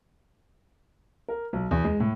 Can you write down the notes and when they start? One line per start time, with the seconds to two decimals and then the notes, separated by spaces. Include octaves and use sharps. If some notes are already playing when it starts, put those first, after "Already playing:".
1.28 A#4
1.53 B1
1.71 E2
1.85 G#3
2.00 A2